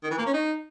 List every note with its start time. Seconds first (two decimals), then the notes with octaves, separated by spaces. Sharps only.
0.03 D#3
0.11 E3
0.18 A#3
0.26 C#4
0.33 D#4